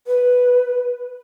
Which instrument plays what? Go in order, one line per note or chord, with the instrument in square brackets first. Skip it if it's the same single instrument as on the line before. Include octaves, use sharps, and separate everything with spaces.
[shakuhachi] B4